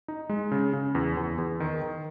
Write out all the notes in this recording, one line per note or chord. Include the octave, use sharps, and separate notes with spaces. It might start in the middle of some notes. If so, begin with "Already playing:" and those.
D#4
G#3
C#3
C#3
E2
E2
E2
D#3
D#3